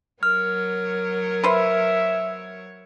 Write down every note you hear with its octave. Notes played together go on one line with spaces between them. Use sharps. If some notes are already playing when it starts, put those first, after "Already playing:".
F#3 A#4 C#5 F6
B4 C5 E5